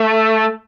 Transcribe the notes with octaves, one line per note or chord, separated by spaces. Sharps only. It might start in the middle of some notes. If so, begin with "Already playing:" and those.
Already playing: A3